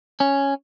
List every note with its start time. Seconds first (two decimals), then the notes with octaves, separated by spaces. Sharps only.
0.20 C#4